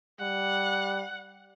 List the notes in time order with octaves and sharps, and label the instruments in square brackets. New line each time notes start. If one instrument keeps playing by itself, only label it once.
[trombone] G3 [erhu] F#5